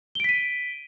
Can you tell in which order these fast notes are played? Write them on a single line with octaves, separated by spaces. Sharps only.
G7 D7 B6 D#7